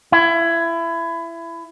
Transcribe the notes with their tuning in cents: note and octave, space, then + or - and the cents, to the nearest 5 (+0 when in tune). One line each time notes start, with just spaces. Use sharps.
E4 +25